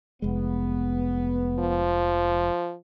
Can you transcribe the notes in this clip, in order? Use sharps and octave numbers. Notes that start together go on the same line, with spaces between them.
F1 G#3 B3
F3